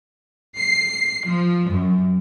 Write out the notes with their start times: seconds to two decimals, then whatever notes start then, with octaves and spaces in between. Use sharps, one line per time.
0.55 C7
1.24 F3
1.68 F#2